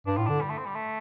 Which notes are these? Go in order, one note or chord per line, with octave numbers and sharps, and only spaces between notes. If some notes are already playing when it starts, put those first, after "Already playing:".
G2 D4
A2 F4
D3 D4
G3
A3
C4
G3
A3